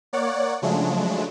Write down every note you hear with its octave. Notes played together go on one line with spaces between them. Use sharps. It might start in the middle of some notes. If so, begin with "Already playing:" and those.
A#3 C#5 D5 F#5
C#3 F3 F#3 G#3 A3 D4